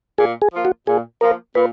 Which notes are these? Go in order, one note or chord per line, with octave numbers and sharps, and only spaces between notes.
A#2 G#4
G#4
F3 A#3 F4
F#4
A#2 G#4
F3 A#3 F4 A#4
A#2 B4